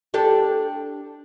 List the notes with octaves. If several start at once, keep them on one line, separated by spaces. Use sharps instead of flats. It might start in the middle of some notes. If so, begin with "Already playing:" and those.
D4 G4 A4